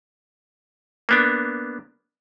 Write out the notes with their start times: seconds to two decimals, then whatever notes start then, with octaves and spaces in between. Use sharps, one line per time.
1.09 A#3 B3 D4